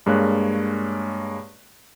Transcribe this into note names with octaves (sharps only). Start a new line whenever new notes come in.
G2 G#3 A#3 C#5 F#6